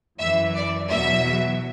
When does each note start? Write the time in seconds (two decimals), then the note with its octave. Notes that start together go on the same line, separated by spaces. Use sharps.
0.19 F#2 E3 E5
0.55 D5
0.90 E2 B2 F#3 E5